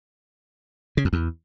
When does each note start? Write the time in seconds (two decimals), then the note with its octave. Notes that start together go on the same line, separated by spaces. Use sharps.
0.97 C#3
1.05 F2
1.13 E2